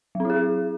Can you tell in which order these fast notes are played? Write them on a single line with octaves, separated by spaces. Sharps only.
F#3 C4 E4 G#4